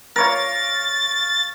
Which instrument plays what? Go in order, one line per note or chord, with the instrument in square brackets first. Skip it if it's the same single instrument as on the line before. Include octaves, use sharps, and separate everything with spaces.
[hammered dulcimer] A#4 C#5 F5 [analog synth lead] A6